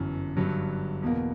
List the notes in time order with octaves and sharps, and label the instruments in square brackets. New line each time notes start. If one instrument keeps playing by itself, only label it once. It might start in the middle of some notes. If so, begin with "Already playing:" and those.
Already playing: [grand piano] G1 F#2 E3
G1 G2 F#3
E2 B2 A#3